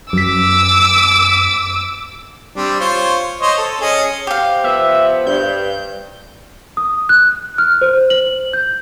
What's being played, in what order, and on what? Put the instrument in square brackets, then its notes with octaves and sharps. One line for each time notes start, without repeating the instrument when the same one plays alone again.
[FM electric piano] F#2 B6 [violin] D6 E6
[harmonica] G3 C4 D4
F4 C5 C#5
C5 C#5 D#5
A4
C#4 G#4 D#5
[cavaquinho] G4 F5 [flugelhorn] C5
[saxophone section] F3 A3 B3 [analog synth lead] E5
[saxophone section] G2 [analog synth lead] G6
[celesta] D#6
F#6
F6
C5
F#7
G6